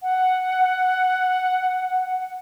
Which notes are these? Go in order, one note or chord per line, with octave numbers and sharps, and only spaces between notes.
F#5